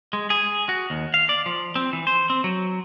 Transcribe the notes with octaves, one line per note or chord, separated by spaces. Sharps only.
G#3
G#4
F#4
D#2
F5
D5
F3
C4
E3
C5
C4
F#3